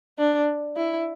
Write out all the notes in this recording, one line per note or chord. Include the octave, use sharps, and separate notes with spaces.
D4
E4